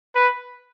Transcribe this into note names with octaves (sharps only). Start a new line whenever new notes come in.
B4